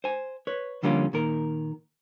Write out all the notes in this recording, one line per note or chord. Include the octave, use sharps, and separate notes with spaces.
C5 G#5
B4 C#5
F2 D3 G3 A#3 C#4 F4
A#2 D#3 A#4